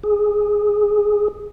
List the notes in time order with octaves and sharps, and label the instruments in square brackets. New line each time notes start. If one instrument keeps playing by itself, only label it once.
[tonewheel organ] G#4